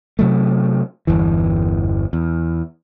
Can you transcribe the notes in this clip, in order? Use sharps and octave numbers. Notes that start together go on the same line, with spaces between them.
C3 F#3 A3
G1 E2 E3
E2